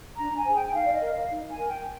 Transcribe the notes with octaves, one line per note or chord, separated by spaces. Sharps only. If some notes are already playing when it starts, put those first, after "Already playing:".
D4 A#5
G#5
G#4 C5
G5
G5
D#4 F5
D5
D#5
A#4
F5
D#4
G#5
A#4
G5